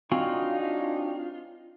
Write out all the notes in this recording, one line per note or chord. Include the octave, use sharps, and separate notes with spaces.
G#2 F#3 C4 D4 D#4 F4 F#4 G#5